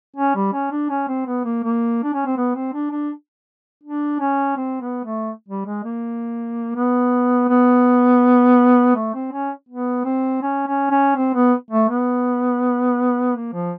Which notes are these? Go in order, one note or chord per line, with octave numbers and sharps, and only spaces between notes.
C#4
G3
C#4
D4
C#4
C4
B3
A#3
A#3
D4
C#4
C4
B3
C4
D4
D4
D4
C#4
C4
B3
A3
G3
G#3
A#3
B3
B3
A3
C4
C#4
B3
C4
C#4
C#4
C#4
C4
B3
A3
B3
A#3
F3